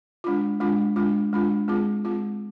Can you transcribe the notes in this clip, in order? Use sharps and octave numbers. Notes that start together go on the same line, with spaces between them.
G#3 D4 F4
G#3 D4 F4
G#3 D4 F4
G#3 D4 F4
G#3 C4 F4 G#4
G#3 C4 F4 G#4